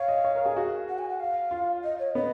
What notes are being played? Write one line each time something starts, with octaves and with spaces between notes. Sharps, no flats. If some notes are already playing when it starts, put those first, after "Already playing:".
Already playing: C#5 F5
D#5
C#5
A#4
G#4
F#4
F#5
G#5
F#5
F5
F4
D#5
C#5
B3 D#5